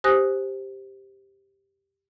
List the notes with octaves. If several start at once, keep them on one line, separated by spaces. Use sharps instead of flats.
G4 C5 G#5 D#6 F#6 A#6